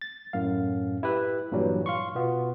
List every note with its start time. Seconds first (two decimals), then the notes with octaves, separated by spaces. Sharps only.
0.01 A6
0.33 F#2 A2 F5
1.03 E4 G4 B4 E5
1.52 G2 A#2 E3 F#3 G3
1.86 F5 C6 C#6
2.15 B2 B3 F4